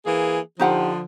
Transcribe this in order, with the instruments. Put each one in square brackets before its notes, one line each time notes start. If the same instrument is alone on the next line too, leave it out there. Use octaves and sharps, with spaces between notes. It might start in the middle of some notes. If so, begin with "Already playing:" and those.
[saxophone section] E3 A#3 G#4
[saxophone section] D3 F3 [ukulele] D#4 G4 F#5